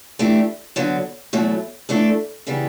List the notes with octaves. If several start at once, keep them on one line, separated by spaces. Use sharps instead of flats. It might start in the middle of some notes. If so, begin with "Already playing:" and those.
E3 A3 D4 G4
D3 F#3 B3
E2 B2 F#3 A3
E3 A3 D4 A4
C#3 E3 G3 B3